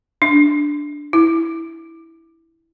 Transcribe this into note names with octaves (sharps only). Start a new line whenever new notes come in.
D4
E4